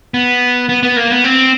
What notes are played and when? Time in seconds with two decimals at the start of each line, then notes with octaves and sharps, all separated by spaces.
0.14 B3
0.69 B3
0.83 B3
0.96 A#3
1.11 B3
1.24 C4